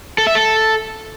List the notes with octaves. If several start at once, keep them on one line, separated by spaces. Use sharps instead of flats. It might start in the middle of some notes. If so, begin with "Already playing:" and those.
A4
E5
A4